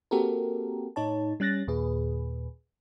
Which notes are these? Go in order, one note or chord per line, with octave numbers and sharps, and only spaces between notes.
A#3 C4 F#4 G4 A4 A#4
A2 D#4 C#5 A5
G3 C#4 F#6 A6 A#6
D#2 A#2 G#4 B4